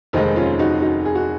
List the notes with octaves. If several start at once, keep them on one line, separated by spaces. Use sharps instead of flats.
F1 D#2 D#3 G#3 C4 D#4
C#4 F4
D#4 F#4
D#4 F#4
G#4
F#4